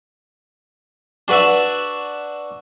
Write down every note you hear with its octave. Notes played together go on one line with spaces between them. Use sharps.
D4 F#4 B4 D5 E5